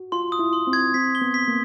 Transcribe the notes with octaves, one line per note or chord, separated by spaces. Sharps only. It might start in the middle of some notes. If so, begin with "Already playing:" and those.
Already playing: F#4
F4 C6
D#6
E4
C6
C4
G#6
C4 B6
G7
B3
B6
A#3